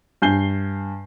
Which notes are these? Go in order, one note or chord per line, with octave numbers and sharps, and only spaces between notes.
G2 G#5 G6 C7 G7